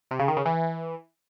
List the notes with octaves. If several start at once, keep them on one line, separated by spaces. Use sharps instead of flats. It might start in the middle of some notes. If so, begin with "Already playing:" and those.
C3
C#3
D#3
C#3
E3